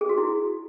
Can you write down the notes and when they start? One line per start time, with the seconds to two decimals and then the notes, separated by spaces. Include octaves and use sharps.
0.01 G#4
0.09 F#4
0.18 E4